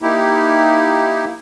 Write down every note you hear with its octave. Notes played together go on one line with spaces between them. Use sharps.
A#3 D#4 E4 G4